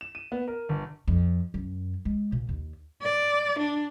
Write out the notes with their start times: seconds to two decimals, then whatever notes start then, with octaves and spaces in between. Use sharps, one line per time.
0.01 E7
0.15 D#7
0.32 B3
0.48 A#4
0.69 G1
1.08 F2
1.54 F#2
2.05 G#3
2.32 A#2
2.49 D#2
3.02 D5
3.59 D4